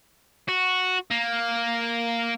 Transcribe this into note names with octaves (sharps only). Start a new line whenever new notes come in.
F#4
A#3